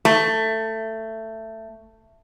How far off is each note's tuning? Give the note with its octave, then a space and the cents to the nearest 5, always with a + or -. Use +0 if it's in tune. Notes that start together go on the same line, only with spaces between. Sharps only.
A3 +15